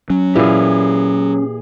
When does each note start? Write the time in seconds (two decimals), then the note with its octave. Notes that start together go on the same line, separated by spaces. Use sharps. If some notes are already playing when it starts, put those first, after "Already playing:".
0.10 F#3 C#4
0.36 A#2 E3 E4 G4 G#4